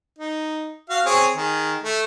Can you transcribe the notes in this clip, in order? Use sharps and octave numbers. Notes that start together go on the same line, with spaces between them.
D#4
F#4 F5
C4 G#4 C#5
D#3 G#4
A3